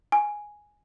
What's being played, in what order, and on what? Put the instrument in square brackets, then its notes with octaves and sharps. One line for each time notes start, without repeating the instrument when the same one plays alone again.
[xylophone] G#5